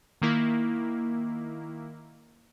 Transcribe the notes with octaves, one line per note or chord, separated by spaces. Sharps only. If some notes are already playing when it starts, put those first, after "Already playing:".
D#3 A#3 E4